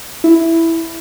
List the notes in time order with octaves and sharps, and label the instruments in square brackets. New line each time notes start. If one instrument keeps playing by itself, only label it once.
[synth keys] E4